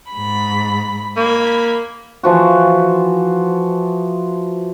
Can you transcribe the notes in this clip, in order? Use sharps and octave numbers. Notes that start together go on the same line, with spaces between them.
G#2 B5
A#3 B5 G#6
E3 F3 F#4